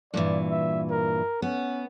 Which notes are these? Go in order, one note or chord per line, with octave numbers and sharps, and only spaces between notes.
G2 A#2 E3 D5
E5
A#4
B3 C#4